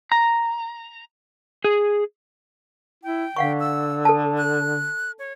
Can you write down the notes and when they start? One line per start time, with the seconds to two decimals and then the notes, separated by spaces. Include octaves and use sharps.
0.12 A#5
1.64 G#4
3.03 E4 G5
3.36 D3 F5 F#5 C#6
3.60 E6
4.05 A4 A5
4.37 F#6
5.19 C#5